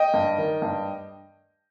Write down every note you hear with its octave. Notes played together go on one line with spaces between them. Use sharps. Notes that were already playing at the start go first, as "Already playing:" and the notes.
Already playing: D#5 G5
G2
D#3
G2